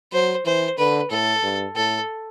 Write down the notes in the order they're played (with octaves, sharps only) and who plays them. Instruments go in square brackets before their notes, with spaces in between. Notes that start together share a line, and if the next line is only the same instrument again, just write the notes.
[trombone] F#3 [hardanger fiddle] C5
[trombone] E3 [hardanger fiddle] C5
[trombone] D3 [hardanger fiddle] B4
[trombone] A2 [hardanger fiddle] A4
[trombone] G2
[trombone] A2 [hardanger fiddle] A4